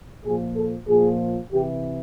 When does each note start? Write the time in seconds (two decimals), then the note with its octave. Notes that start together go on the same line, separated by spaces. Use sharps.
0.24 A#2 F3 G#4
0.56 A4
0.87 A#2 F3 G#4
1.52 C3 E3 G4